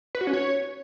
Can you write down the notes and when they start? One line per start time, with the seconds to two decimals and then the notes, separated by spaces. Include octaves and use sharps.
0.15 B4
0.21 F#4
0.27 C#4
0.33 C#5